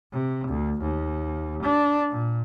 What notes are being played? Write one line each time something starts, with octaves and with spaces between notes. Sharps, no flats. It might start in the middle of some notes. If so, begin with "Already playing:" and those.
C3
D2
D#2
D4
A#2